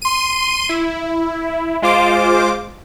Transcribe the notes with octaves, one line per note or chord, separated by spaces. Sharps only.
C6 D#7
E4
G#3 F4 C5 D6